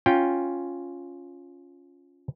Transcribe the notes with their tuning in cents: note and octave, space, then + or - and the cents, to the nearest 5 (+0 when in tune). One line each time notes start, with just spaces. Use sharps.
C#4 +0 F4 +5 G5 +0